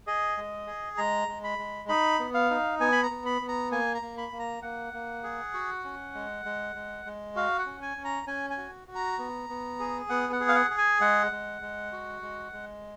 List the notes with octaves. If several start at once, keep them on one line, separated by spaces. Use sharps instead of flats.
G#4 D#5
G#3
G#4
G#3 A#5
G#3
B5
G#3
D#4 B5
B3
F5
D#4
B3 G#5
B5
A#5
B3
B5
B3
A#5
A#3 G#5
A#5
A#3
B5
A#3
A#5
A#3 F#5
A#3
G#4
F#4
C#4
G#3
G#3
G#3
G#3
F#4 F5
F#5
C#4
G#5
C#4
A#5
C#4 G#5
G#5
F#4
F#4
A#5
B3
B3
G#4
B3 F#5
F#5
G#4
F5
F#5
G#4
G#5
G#3 F#5
G#3
G#3
F#4
G#3
G#3